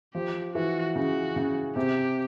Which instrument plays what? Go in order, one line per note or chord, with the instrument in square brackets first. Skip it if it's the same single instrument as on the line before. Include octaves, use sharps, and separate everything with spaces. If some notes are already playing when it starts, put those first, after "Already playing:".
[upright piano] F3 [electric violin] G4
[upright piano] E3 [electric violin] F#4
[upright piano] C#3 [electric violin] F#4
[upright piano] C#3
[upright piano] C3 [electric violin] G4